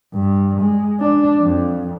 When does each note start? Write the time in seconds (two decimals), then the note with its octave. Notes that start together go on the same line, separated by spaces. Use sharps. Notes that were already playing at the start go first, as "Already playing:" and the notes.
0.14 G2
0.61 G#3
1.00 D4
1.42 F2